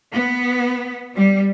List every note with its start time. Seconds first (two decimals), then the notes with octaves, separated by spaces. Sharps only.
0.13 B3
1.15 G3